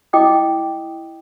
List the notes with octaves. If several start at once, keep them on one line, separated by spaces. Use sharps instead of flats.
E4 D#5 G5 D6 D#6